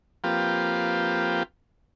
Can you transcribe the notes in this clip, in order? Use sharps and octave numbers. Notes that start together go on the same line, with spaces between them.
F3 A#3 C4 F4 G4 B4